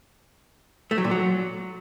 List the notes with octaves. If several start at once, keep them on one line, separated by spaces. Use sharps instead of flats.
A3
F#3
A#2
F#3